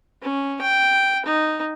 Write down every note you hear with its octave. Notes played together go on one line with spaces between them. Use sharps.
C#4
G5
D#4